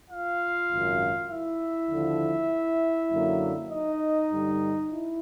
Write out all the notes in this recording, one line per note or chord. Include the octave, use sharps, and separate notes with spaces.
F4 F5
G#1 F#2 C#3
E4 E5
D#2 D3 F3
F#2 D3 F#3 A#3
D#4 D#5
G2 D3 G3
E4